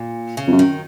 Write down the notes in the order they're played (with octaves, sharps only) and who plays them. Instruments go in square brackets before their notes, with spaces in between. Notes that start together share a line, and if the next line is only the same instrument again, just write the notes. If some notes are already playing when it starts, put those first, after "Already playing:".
Already playing: [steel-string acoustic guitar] A#2
C#3
[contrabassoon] F2
F#2
[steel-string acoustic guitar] D#3